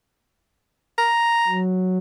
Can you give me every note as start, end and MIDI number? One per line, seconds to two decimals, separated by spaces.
0.98 1.60 82
1.47 1.98 54